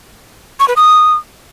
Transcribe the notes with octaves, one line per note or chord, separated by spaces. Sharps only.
C#6
B4
D#6